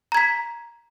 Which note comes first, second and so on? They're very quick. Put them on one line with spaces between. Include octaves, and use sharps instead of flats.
A#5 G#6 B6